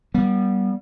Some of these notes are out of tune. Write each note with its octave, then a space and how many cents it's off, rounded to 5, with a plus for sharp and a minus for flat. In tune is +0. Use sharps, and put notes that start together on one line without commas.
G3 -15 B3 -35